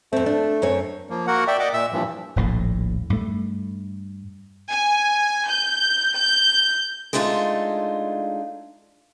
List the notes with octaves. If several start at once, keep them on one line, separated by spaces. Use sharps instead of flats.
F2 A3 C4
D4
F#2 C4 C#5
F3 A#3
A#3 F#4 A#4 F#5
D5 E5 G5
D5 D#5 F#5 D6
A#2 E5 E6
G2 A#2 E3 F3
D#1 A#1 A2
G2 A3
G#5
G6
G6
G#3 A3 D4 D#4 F4